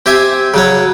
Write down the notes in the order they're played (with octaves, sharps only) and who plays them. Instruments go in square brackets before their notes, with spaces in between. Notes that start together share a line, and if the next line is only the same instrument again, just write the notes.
[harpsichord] C4 G4 E5 G#5
C#3 F#3 C#5